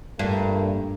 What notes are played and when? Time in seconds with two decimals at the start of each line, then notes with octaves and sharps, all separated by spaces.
0.19 G2 A#2 A3 A#3